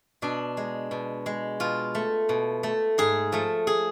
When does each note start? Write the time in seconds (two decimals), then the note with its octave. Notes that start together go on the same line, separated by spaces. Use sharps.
0.22 B2 D4
0.57 G#3
0.91 B2
1.26 G#3
1.60 B2 F4
1.95 A3
2.29 B2
2.63 A3
2.98 G#2 G#4
3.32 F3 A3
3.67 G#4